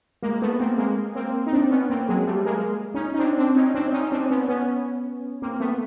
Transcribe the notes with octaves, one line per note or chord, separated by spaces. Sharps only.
G#3 A#3
A3 B3
A#3 C4
G#3 A#3
A#3 C4
D#4
C4 D4
B3 C#4
A#3 C4
F#3 G#3
G3 A3
G#3 A#3
C#4 D#4
D#4
C4 D4
C4 D4
C#4 D#4
C4 D4
C#4 D#4
C4 D4
B3 C#4
B3 C#4
A#3 C4
A3 B3